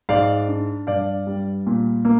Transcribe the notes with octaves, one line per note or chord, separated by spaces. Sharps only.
G#2 D5 F5
D4
G2 D5 F5
G3
A#2
A#3